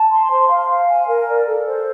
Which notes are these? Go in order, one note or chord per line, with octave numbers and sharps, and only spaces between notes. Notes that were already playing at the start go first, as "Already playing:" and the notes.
Already playing: A5
C6
C5
F5
F5
G#5
A#4
D5
A4
C5